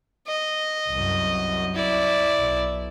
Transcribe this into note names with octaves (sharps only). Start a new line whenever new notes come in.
D#5
C2 F#2
E4 D5
B1